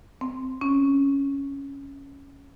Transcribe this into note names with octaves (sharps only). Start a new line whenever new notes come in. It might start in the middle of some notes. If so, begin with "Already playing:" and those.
C4
C#4